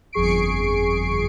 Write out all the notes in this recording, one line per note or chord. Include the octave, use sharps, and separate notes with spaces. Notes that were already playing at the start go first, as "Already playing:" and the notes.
G1 F2 G#4 C#6 C7 D7